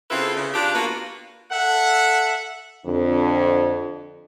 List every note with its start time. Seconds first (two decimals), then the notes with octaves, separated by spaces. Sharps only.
0.10 C#3 C4 E4 F4 A4 B4
0.36 C#3
0.54 D4 F4 G4
0.74 A#3 B3 F4 F#4 B4
1.52 A4 E5 F#5
2.86 F2 D3 D4